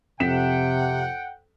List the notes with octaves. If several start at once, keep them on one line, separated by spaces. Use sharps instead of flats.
F2 C3 F#5 G5 B6 E7